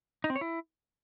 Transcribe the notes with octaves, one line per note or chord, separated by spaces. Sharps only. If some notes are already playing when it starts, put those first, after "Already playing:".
D#4
C4
C#5
E4